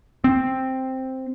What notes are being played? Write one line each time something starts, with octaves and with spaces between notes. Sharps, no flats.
C4